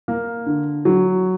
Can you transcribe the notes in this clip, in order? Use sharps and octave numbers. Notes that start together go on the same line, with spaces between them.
A#3
D3
F#3